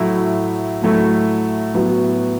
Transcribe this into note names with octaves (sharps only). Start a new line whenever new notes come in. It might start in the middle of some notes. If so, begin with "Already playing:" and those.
Already playing: A2 F#3 A3 E4
A2 F#3 A3 E4
A2 F#3 B3 F#4